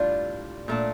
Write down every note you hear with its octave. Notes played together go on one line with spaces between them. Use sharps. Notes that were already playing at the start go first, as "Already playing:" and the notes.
Already playing: A2 G3 D4 F4
A#2 A3 D4